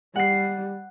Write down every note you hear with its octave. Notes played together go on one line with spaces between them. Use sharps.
G3 F#5 C7